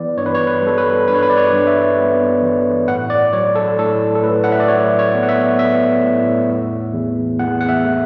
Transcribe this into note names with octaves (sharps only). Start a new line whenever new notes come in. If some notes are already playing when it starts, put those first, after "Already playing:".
Already playing: E3 B3 D5
G2 C#5
B4
C#5
B4
G3 A4
B4
G2 B4
C#5
B4
D5
C#5
G2
E5
B3
E3
A2 F#5
D5
F#3 C#5
A4
A2 A4
A4
A2 B4
F#5
E5
D5
F#3 C#5
C#5
B3
F#5
E5
B3 E5
A2
E2
E2
E2 F#5
F#5
E5
A3